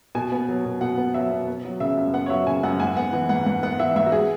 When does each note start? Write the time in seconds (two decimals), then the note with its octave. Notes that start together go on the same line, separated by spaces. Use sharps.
0.15 B2 G#5
0.32 B3
0.48 F#3
0.65 B2
0.81 B2 F#5
0.98 B3
1.14 F#3 E5
1.31 B2
1.47 B3
1.64 F#3
1.80 C#3 E5
1.97 F#2
2.13 B3 F#5
2.26 C#5
2.30 F#3 E5
2.47 C#3 G#5
2.63 F#2 F#5
2.80 G#2 G#5
2.97 B3 F#5
3.13 E3
3.29 G#2 F#5
3.46 G#2 F#5
3.63 B3 F#5
3.79 E3 E5
3.96 G#2 E5
4.06 F#4
4.12 G#4